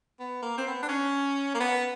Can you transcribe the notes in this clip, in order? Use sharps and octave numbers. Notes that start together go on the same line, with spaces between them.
B3
A#3
C4
B3
D4
C#4
A#3
B3